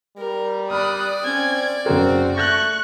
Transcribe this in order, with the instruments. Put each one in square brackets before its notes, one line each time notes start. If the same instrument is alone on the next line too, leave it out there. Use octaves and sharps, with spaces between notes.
[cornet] G3 [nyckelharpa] A#4
[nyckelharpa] D5 [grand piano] B5 F6 [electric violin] D#6 F#6
[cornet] C4 [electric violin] C#4 G#6
[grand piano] F#1 C#4 A#4 [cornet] C4 [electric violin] F#4
[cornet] A3 [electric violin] C#6 F#6 [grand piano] G6 A6 A#6